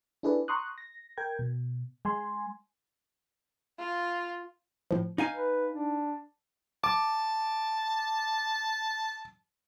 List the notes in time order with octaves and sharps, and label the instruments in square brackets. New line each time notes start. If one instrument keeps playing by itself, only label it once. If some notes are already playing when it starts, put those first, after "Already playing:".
[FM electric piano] D4 E4 G#4 A4 B4 D5
A#5 C6 C#6 D#6 F#6
A#6
A#4 G5 G#6
B2
G#3 G#5 C6
[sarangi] F4
[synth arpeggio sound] A2 F3
[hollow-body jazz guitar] D#4 F5 G#5
[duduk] B4
D4
[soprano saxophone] A5 [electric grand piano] D6